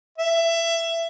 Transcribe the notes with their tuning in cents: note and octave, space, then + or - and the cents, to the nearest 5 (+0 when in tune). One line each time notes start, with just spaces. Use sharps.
E5 +20